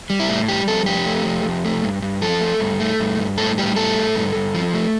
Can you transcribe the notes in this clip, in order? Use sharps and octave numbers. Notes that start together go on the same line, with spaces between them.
G3
E4
A2
G3 G4
F2 A4
F2 G4
A3
F2
F2
A3
G2
G2
F3 A4
A3
G2
A3
G2
G2
A2 A4
G3 G4
A2 A4
A3
G2
G2
F3
A3